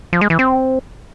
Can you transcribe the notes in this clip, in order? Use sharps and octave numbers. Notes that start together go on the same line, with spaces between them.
F3
G#3
E3
C4